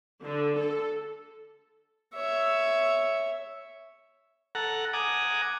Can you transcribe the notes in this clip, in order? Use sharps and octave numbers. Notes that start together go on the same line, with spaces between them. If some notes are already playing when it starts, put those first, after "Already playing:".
D3
A4
C#5 E5
A4 F#5 A#5
F#5 G#5 A#5 D6 D#6